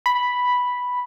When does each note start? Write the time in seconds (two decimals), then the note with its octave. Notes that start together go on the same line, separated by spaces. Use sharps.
0.06 B5